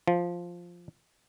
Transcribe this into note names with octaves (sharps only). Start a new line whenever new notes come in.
F3